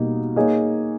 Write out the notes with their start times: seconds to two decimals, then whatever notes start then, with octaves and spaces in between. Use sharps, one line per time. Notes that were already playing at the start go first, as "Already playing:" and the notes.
Already playing: B2 G3 A#3 D#4
0.36 A#3 D#4 G#4 C#5